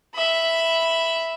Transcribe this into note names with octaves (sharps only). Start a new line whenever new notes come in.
E5 B5